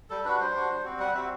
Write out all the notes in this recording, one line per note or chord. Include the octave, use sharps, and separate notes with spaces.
G3 A4
D4 F#4 B4
G3 C5
D4 F#4
G3
C4 F#4
G3 F#5
C4 F#4 E5